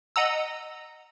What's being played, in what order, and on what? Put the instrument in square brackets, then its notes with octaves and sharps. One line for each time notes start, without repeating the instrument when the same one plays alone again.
[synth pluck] D#5 F#5 A#5 E6